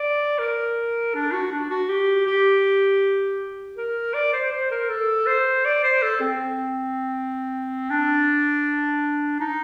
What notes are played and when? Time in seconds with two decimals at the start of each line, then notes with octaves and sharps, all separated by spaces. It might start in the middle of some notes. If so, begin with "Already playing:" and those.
Already playing: D5
0.39 A#4
1.15 D4
1.32 F#4
1.52 D4
1.70 F#4
1.89 G4
2.27 G4
3.77 A#4
4.14 D5
4.33 C5
4.52 C5
4.71 A#4
4.89 A4
5.27 C5
5.65 D5
5.83 C5
6.03 A4
6.21 C4
7.90 D4
9.40 D#4